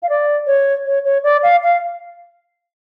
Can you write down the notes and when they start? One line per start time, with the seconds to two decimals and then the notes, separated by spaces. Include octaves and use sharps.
0.03 F5
0.09 D5
0.46 C#5
0.86 C#5
1.05 C#5
1.23 D5
1.43 F5
1.63 F5